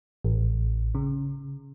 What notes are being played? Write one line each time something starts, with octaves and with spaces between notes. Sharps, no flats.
A1
C#3